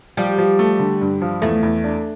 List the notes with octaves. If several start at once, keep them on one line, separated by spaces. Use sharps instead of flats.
F3 G3
F3
A3
D3
G2
F3
E2 A3
E2
D4